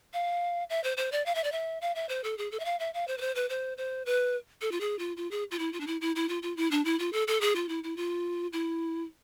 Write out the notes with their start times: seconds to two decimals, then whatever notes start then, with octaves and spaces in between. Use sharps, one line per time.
0.13 F5
0.70 E5
0.84 C5
0.97 C5
1.12 D5
1.26 F5
1.35 E5
1.44 D5
1.52 E5
1.81 F5
1.95 E5
2.09 C5
2.24 A4
2.38 G#4
2.51 A4
2.59 E5
2.65 F5
2.79 E5
2.94 F5
3.07 C5
3.18 B4
3.21 C5
3.35 B4
3.49 C5
3.78 C5
4.06 B4
4.61 A4
4.71 F4
4.80 G#4
4.99 F4
5.17 F4
5.31 G#4
5.51 F4
5.59 E4
5.73 F4
5.80 D4
5.87 E4
6.01 E4
6.16 E4
6.29 F4
6.42 F4
6.57 E4
6.71 D4
6.85 E4
6.99 F4
7.13 A4
7.27 A4
7.41 G#4
7.55 F4
7.69 E4
7.83 E4
7.97 F4
8.53 E4